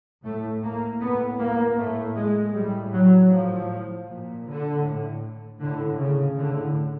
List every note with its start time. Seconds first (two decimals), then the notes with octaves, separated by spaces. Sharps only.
0.24 A2 A3
0.63 A#3
1.01 A2 B3
1.39 A#3
1.78 A2 A3
2.16 G#3
2.54 A2 G3
2.93 F#3
3.31 A2 F3
4.08 A#2
4.47 D3
4.85 A2
5.61 A2 D3
5.99 C#3
6.39 A2 D3